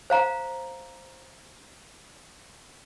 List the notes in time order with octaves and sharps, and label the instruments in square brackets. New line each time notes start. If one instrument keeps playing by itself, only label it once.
[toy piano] C5 F5 A#5